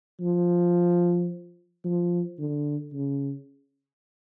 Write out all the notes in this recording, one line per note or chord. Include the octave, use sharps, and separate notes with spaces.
F3
F3
D3
C#3